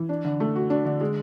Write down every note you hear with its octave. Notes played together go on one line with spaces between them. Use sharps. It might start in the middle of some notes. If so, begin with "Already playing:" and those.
Already playing: E3
D4
D3
A3
F#4
D4
D3
G#3